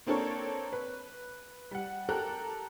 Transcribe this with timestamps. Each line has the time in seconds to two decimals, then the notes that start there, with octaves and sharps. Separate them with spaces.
0.07 A#3 C4 D4 A4 A#4 C#5
0.73 B4
1.71 G3 F#5
2.09 G4 A4 A#4 A#5 F#6